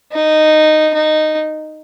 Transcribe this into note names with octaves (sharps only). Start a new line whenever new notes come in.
D#4
D#4